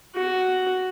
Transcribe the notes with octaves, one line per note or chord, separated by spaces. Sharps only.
F#4